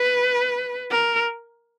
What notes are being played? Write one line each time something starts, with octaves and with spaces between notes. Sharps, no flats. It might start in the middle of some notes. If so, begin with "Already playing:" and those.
Already playing: B4
A#4